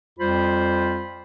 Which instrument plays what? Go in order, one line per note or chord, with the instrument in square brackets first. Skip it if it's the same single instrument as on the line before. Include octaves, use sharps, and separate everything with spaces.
[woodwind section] F2 G3 F4 C5 B5